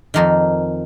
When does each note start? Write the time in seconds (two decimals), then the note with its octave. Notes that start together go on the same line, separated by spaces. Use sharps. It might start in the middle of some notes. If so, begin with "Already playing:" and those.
0.14 F2 D#3 A#3 D#4